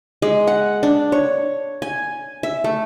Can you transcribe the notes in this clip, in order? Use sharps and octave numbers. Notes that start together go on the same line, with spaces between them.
G#3
F#5
D4
C#5
G#5
E5
A3